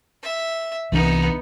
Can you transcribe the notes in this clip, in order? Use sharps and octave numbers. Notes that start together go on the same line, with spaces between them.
E5
C2 E3 B3 D4 D#4